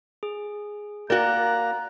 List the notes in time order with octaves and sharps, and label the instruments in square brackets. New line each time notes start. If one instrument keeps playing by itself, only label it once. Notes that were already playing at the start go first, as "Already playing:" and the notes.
[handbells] G#4
[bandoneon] A#3 A#5 [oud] F#4 A#4 [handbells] D5 G5 [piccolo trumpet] F#6